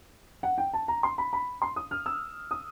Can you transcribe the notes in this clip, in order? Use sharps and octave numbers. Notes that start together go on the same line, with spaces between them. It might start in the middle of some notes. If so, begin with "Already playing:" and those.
F#5
G5
A5
A#5
C6
B5
B5
C6
D#6
F6
E6
D#6